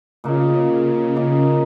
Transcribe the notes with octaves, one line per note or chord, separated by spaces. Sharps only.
A#2 C#3 A#3 D#4
A#2 A#3 D#4